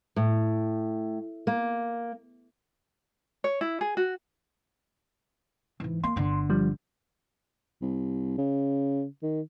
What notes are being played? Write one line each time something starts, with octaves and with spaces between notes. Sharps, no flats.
A2
A#3
C#5
E4
G#4
F#4
G#2 E3
A#3 C6
G1 D3
F3 G3
C2
C#3
D#3